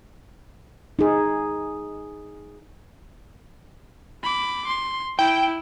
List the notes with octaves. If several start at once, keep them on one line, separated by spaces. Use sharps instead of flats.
D#4 G#4
B5 D6
C6
E4 G5